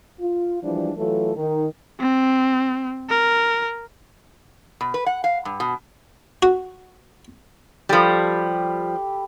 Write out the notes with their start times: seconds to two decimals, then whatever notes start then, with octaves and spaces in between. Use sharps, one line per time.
0.20 F4
0.63 E3 F3 G3 G#3 D4 E4
0.96 E3 F#3 A3 F4 A4
1.36 D#3 D#4
2.00 C4
3.10 A#4
4.81 B2
4.94 B4
5.06 F#5
5.24 F5
5.45 G2
5.60 B2
6.43 F#4
7.89 F3 G3 G4 A4 B5